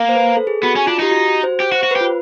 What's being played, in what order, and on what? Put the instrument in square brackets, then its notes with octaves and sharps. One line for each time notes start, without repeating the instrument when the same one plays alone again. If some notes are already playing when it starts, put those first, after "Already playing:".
Already playing: [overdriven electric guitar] A#3
[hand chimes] C5
B4
A4
G#4
[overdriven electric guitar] B3 [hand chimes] F#4
[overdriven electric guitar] C#4
[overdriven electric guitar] D4 [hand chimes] F4
[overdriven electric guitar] D#4 [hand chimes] G4
[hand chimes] F#4
F#4
C5
[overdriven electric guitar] G4
F#4
[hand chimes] C5
[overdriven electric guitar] F#4
[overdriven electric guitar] G4 [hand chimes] B4
[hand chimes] F4